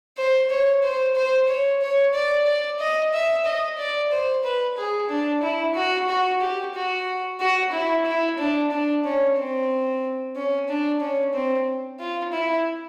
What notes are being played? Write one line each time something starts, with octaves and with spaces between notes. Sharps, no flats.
C5
C#5
C5
C5
C#5
C#5
D5
D5
D#5
E5
D#5
D5
C5
B4
G#4
D4
E4
F#4
F#4
G4
F#4
F#4
E4
E4
D4
D4
C#4
C4
C#4
D4
C#4
C4
F4
E4